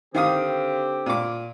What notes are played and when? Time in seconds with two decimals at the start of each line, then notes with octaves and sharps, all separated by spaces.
0.14 D3 D#3 C4 G4 F5 D#6
1.06 A#2 D6